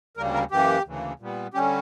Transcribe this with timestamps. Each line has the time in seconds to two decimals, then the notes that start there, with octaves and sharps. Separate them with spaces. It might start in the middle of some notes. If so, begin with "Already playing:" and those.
0.17 D2 C#3 G3 A#3 A#4
0.34 A#4
0.51 F#2 E3 A#3 G4
0.85 D2 C#3 E3 A#3
1.19 A#2 G3 B3
1.54 D3 G3 C#4 G4